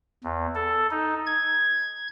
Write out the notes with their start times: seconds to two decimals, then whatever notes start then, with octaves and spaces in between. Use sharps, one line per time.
0.24 E2
0.55 A4
0.91 D#4
1.27 G#6